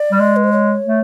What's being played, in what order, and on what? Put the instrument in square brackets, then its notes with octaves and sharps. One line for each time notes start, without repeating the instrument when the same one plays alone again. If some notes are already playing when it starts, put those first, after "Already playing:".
Already playing: [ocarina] D5
[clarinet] G3
G#3
[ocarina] B4
C5
C#5
[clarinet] A3